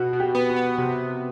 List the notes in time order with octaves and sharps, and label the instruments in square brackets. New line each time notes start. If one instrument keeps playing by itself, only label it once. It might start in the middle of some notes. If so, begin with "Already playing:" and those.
Already playing: [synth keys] B2 [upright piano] F#4
[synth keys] B2
[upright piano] G4
[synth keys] B3
[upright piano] F#4
[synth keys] B3
[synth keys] C3 [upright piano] G4